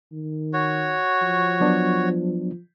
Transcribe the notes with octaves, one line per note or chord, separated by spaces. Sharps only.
D#3
F#4 C#5
F3
F#3 B3 D4